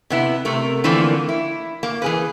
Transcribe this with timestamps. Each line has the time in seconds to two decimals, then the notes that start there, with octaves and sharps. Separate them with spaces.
0.10 C3 B3 E4
0.45 C3 A3 A#4
0.84 D3 E3 F3 A3 A#3 C4
1.29 E4
1.83 A#3
2.02 E3 G#4 B4